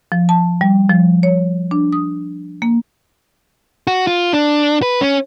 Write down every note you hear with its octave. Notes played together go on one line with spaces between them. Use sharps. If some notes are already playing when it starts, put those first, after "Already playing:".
F3
A5
G3
F3
C#5
D4
D#6
A#3
F#4
F4
D4
B4
C#4